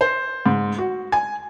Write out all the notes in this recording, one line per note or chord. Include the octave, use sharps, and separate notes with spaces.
C5
G#2
F#4
G#5